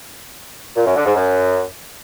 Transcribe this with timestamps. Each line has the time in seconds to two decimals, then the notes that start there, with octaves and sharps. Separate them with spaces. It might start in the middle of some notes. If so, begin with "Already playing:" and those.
0.76 A#2
0.86 F#2
0.96 D3
1.06 G#2
1.16 F#2